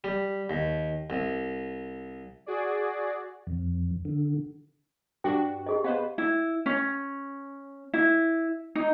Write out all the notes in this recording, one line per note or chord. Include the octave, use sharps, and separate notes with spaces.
G3
D#2
C2
F#4 G#4 D5
F2
D3
G2 D4 F#4 G5
G4 G#4 D#5
B3 B4 C5 D#5 F5 F#5
E4
C#4
E4
D#4